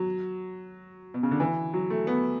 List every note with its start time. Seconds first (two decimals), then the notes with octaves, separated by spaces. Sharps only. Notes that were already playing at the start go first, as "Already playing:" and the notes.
Already playing: F#3
1.14 B2
1.23 C#3
1.31 D3
1.40 E3
1.74 F#3
1.90 A3
2.07 B3